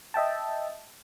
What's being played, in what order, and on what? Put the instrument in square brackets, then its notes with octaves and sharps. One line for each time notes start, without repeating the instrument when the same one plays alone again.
[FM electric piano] D#5 E5 G5 A5